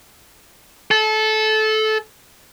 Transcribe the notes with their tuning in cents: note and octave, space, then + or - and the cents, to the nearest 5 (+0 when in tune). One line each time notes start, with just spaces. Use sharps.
A4 -20